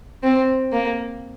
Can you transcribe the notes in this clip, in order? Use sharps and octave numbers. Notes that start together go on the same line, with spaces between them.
C4
A#3